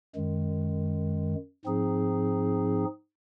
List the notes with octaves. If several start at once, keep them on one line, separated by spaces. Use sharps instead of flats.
F#2 D#3 G#3
G#2 F3 C4 D#4 G#4